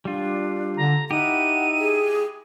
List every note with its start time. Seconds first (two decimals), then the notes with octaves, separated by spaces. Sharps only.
0.05 G3 D4 F4
0.77 D3 A#5
1.11 D#4 E4 G4 F#5 D#7
1.79 G#4